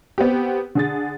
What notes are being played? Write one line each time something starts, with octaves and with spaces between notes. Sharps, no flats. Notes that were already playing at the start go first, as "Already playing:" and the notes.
B3 C4 G4
D3 G#4 A6